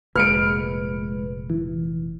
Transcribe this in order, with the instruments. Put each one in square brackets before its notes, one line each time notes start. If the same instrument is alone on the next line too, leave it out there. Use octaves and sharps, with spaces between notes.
[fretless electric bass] F1 A#2 [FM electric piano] G#3 B4 [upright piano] F6 C#7 D7
[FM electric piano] E3